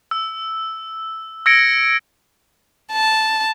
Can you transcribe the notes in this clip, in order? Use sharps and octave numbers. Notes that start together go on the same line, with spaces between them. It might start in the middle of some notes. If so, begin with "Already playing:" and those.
E6
E6 G#6 A#6 C#7 D7
A5